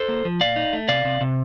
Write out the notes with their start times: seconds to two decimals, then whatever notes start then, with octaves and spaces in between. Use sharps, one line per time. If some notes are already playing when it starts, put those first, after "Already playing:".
Already playing: A4 C5
0.08 A#3
0.25 F3
0.41 A#2 D5 F5
0.56 D#4
0.73 A3
0.89 C3 D5 F5
1.05 C3
1.21 C3